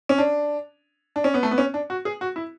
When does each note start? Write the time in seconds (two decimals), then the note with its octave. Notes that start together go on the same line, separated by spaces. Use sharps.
0.09 C#4
0.18 D4
1.16 D4
1.24 C#4
1.34 B3
1.43 A3
1.51 B3
1.58 C#4
1.74 D4
1.90 F#4
2.05 G#4
2.21 F#4
2.36 E4